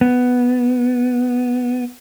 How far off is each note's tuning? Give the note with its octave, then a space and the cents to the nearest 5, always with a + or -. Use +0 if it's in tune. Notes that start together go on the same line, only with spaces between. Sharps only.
B3 +0